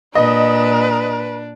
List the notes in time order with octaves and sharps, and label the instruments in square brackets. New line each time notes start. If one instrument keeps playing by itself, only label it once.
[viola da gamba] A#2 [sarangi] D4 [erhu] B4 [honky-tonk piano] D#5